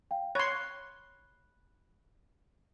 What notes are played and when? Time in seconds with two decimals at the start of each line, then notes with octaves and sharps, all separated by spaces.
0.11 F5 G5
0.35 C#5 B5 C6 F#6